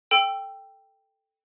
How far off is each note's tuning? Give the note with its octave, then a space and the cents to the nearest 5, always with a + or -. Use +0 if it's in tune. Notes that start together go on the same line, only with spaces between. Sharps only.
A4 +0 G5 +5 E6 +20